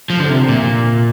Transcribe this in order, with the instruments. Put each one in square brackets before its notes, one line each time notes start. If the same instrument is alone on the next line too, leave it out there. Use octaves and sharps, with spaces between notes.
[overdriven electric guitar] F3
D3
C3
A#2